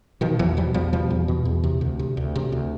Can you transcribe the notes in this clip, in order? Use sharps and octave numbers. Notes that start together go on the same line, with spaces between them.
B2 D#3 F3
E2 E3 F#3
B2 F3 G3
E2 F3 G3
B2 F3 G3
E2
B2
E2
C3
D2
C3
D2
C3
D2